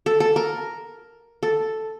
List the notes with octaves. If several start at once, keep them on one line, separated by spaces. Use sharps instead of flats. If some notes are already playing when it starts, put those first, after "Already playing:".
A4
A4
A#4
A4